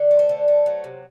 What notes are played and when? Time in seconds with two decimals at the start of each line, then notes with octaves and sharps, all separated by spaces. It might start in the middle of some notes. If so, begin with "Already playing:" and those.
Already playing: D3
0.11 A3
0.19 C5
0.29 D3
0.48 A3
0.66 F#3
0.84 C3